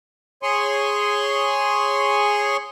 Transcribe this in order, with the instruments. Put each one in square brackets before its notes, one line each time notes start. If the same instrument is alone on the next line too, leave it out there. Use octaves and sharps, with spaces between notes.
[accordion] G#4 C#5 G#5 C6 C#6